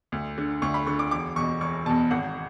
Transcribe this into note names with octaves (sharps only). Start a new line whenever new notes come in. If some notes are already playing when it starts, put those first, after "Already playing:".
D2
D3
D2 C#6
B5
D3 C#6
D6
E1 D6
E2 B2 C#6
E1 C#6
E2 B2 A5
G#1 F#5